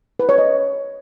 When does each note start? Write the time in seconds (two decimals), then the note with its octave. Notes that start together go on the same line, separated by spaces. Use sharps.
0.19 B4
0.29 C#5
0.38 D#5